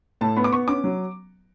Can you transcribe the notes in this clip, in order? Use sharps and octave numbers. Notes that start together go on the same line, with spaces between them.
A2 A5
B3 B5
D6
B3 C#6
C#4 D6
F#3